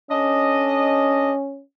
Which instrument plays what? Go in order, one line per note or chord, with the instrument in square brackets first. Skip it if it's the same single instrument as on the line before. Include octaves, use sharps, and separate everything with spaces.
[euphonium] C#4 [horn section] D4 A4 D#5